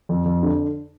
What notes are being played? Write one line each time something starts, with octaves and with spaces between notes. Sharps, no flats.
F2
F2
D3